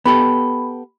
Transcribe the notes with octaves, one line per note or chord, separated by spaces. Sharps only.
B3 G4 A4 B5